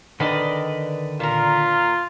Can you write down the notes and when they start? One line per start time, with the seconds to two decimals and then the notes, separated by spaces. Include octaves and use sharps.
0.20 D3 D#3 B4 D5 D#5
1.20 A#2 F4 A#4